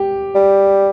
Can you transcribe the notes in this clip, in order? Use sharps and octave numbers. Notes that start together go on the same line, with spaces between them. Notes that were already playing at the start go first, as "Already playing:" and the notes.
Already playing: G4
G3